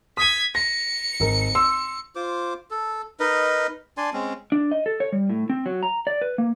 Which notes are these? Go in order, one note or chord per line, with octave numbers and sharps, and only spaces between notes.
D#6 G#6 B6 D#7
A#6 C#7
G#1 A#4
C6 E6
F4 C5 D6
A4
D#4 A#4 B4 D#5
D4 D5 G#5 C6
G#3 C4 C#4
D4
D#5
A4
C#5
G3
A2
C4
F#3
A#5
D5
B4
A#3